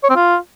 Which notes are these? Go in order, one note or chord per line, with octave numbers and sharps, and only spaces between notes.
C#5
C4
F4